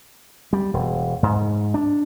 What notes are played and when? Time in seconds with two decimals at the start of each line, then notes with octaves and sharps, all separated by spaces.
0.53 G3
0.74 E1
1.23 G#2
1.74 D4